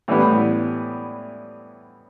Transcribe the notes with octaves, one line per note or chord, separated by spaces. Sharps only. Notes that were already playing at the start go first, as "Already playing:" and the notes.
A2 E3 G3 B3